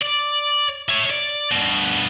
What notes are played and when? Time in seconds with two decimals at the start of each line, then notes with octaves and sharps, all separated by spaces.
0.02 D5
0.89 E4 C#5
1.10 D5
1.51 G2 B2